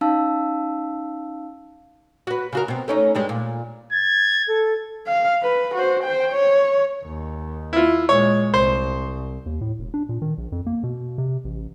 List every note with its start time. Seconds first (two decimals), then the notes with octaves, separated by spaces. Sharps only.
0.01 C#4 D#4 F5 A5 E6
2.27 F#4 B4
2.53 C#3 F#4 A#4
2.68 B2 C4
2.88 A3 C#4 D#4
3.15 G2 G3 G#3
3.29 A#2
3.93 G#6 A6
4.48 A4
5.07 F5
5.42 B4
5.74 F#4 C5
6.03 C5 G5
6.32 C#5
7.05 D#2
7.73 E4 F4
8.09 A#2 G#3 C#5
8.54 C2 C5
9.46 D#2
9.61 A2
9.79 E1
9.94 D4
10.09 A#2
10.22 D#3
10.38 A#1
10.52 F2
10.66 A#3
10.83 B2
11.18 C3
11.45 A1